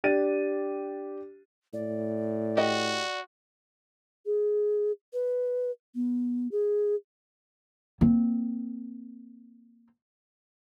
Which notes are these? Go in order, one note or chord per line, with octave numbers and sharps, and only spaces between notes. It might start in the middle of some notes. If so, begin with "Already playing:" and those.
D4 G4 A6 D#7
A2 D5
F#4 G4 D#5
G#4
B4
B3
G#4
A#3 C4